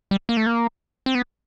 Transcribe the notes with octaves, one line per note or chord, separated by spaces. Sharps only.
G3
A#3
A3
A#3
C4
B3